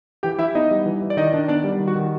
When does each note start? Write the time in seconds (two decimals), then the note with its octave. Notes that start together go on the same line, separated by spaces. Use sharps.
0.23 E3 G4 G5
0.39 E3 E4 E5
0.55 B3 D#4 D#5
0.71 G3
0.86 E3
1.02 E3
1.10 D5
1.17 D#3 D#4 D#5
1.33 D#3 D4 D5
1.48 B3 D4 D5
1.64 G3
1.80 D#3
1.87 F#4
1.96 D#3